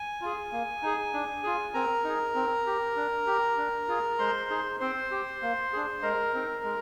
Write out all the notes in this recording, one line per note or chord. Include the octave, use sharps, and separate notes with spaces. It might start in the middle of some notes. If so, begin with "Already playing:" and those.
Already playing: G#5
F4 G#4
A#3
D#4 G#4
D4
F4 G#4
C4 A#4 A#5
D#4 G#4
C4
G4
D4
G4
D4
F4 G#4
G#3 C5 C6
D#4 G#4
C4 C5 C6
G4
A#3
D4 G#4
G#3 A#4 A#5
C4 D#4
G#3